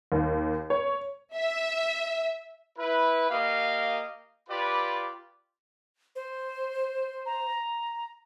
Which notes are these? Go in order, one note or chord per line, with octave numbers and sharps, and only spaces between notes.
D#2
C#5
E5
E4 B4
A#3 G4 A#4 D#5 F5
F4 G4 B4 D5 B5
C5
A#5